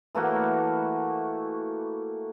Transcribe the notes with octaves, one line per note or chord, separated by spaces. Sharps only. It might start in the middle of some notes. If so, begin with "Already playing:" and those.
E3 A3 A#3 F#4